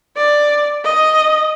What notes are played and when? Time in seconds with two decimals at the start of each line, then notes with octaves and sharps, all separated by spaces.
0.16 D5
0.84 D#5